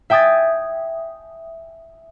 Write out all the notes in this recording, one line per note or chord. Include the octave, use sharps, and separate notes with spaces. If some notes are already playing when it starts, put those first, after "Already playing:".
E5 G5 G#5 D#6 G#6 A6